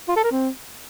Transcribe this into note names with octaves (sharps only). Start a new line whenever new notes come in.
F4
A4
A#4
C4